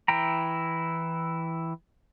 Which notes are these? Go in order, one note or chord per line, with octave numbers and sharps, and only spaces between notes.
E3 E4 G5 A#5